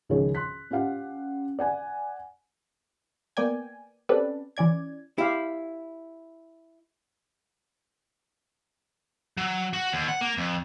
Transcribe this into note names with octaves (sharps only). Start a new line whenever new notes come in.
C#2 D#3 F3 G#4 C#5
C6 F#6 B6
C#4 F4 G4 F5 F#5
D5 F#5 G#5
A#3 B3 D5 G5 G#5
C4 C#4 G4 A4 B4 D5
E3 C#4 D5 G#6
E4 G4 F5
F#3
F#4
D#2
F#5
A#3
F2